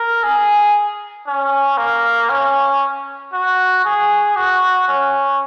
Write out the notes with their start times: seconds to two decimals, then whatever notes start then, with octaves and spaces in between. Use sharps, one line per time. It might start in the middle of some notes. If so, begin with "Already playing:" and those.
Already playing: A#4
0.24 G#4
1.27 C#4
1.78 A#3
2.30 C#4
3.33 F#4
3.85 G#4
4.36 F#4
4.88 C#4